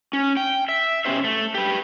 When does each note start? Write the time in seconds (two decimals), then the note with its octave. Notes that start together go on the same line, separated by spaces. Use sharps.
0.13 C#4
0.37 G5
0.68 E5
1.05 B2 C#4 G4 C5 E5
1.24 A3
1.54 G4 B4